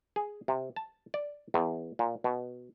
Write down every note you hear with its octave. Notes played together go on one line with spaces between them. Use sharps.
G#4
C3
A5
D5
E2
A#2
B2